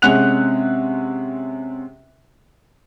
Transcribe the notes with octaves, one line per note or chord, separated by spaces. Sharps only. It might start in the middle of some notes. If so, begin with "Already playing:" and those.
C3 G#3 C#4 F#5 F#6 F7